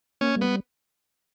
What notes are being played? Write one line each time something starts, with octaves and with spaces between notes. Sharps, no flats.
A#3 C#4
G3
B3